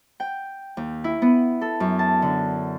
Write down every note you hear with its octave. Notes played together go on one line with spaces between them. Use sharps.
G5
D#2
E4
B3
A4
F#2
A5
D3